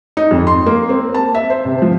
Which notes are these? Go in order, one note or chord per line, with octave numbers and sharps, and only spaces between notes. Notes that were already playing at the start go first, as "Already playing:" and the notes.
D#4
F2
C6
A#3
C4
A5
E5
C5
C3
F3